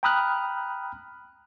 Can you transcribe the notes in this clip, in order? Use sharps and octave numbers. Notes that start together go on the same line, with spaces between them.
G5 A#5 B5 D#6 F6 F#6